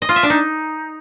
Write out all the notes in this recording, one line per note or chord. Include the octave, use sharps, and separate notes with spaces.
D#5
F4
E5
D4
D#4